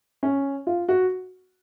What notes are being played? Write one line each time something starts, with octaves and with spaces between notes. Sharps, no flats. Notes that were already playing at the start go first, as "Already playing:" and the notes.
C#4
F4
F#4